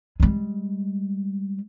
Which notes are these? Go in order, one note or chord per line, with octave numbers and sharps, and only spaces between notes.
G3 G#3